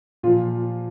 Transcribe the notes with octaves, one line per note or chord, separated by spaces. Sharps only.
A#2 F3 F4